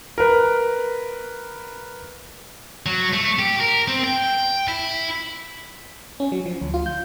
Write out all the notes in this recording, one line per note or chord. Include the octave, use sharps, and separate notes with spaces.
A#4 B4
F#3
A3
G4
A#4
C4
G5
E4
C#4
F#3
F3
D2
F4
G6